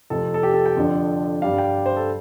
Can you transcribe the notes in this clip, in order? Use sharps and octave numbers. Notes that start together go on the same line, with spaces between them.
F1 F2 C3 F3 A4
A4
G4
A4
G5
F2 D3 F3 D4
G2 G3 D4 F5
G5
C5
A4